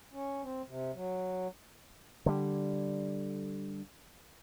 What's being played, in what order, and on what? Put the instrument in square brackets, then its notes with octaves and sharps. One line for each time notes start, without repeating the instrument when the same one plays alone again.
[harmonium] C#4
C4
C3
F#3
[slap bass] D3 G3